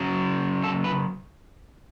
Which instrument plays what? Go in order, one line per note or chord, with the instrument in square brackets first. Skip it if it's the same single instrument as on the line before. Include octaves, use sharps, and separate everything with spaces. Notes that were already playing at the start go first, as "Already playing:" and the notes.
Already playing: [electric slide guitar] C#3 F#3 C#4
A4
B4